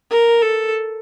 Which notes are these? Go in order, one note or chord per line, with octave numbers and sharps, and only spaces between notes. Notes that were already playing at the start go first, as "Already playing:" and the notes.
A#4
A4